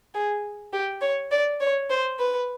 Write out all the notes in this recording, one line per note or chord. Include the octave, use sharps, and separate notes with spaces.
G#4
G4
C#5
D5
C#5
C5
B4